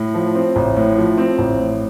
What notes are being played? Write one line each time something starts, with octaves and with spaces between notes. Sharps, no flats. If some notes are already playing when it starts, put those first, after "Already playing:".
Already playing: A2
F3
C4
A1
A2
F3
C4
A1
A2